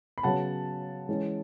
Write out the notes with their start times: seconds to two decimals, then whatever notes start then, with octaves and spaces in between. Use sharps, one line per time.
0.18 B5
0.23 C#3 F#3 B3 F#5 A5
1.09 E3 G#3 C#4